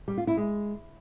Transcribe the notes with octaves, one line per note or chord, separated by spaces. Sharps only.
G3
F4
E4
G#3